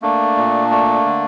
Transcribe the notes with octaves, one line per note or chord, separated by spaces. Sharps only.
A3 A#3 D4
A#2
A3
D3